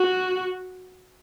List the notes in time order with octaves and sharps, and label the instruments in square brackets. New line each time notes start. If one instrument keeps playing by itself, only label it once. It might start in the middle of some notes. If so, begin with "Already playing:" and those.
Already playing: [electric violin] F#4